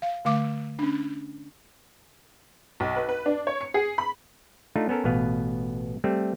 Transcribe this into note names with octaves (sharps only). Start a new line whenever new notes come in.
F5
D3 A3 F5 D6
C#4 D4
B1
B4
B4
D4
C#5
C#7
G#4
B5
A3 D4 D#4 F4
B3 C#4 A4 A#4
A1 B2 B3 B4 F5
G3 A3 C4